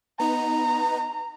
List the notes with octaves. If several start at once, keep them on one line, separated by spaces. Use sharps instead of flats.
B3 D#4 A#5